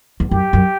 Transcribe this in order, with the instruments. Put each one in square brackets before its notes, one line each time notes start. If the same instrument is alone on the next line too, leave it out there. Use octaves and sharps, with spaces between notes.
[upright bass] E2
[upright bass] F#2 [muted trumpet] G4
[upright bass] F#2